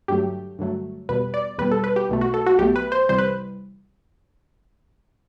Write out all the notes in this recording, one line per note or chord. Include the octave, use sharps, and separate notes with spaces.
G2 D3 F#3 A3 G4
G2 D3 F#3 A3
E2 B2 G3 B4
D5
E2 B2 G3 B4
A4
B4
G4
B1 B2 A3
F#4
A4
F#4
B1 B2 A3 G4
B4
C5
C2 C3 E3 G3 C5
B4